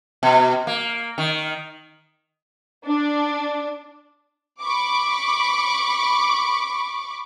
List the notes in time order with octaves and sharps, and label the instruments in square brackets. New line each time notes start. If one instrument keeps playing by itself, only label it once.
[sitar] B2
A#3
D#3
[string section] D4
B5 C#6 D6